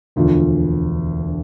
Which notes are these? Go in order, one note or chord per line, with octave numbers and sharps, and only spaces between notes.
E1 D2 D3 F3